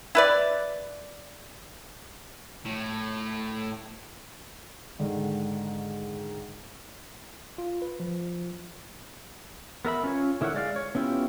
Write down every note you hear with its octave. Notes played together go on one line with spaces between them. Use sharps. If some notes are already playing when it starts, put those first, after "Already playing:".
E4 B4 D5
A2
G#2 D3 D#3
F4
B4
F3
B3 A#4 E5 B5
C#4 F4 C#5
D3 E4 A#4 C#5 F#5
G#3 D5 F5
C#5
B3 C#4 E4 F4 G4